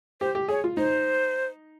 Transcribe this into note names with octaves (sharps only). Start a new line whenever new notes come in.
G4 C5
G4
G#4 C#5
F4
D#4 C5